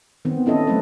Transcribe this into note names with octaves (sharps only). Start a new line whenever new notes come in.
D#3 B3 C4
C#4 E4 A4 D#5
F#3 A3 C4 B4